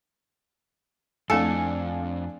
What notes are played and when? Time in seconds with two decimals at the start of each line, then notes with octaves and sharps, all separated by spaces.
1.30 F2 A3 C4 D4 E4 A4 F5 G#5